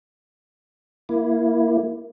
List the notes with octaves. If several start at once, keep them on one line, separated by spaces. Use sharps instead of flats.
A#3 E4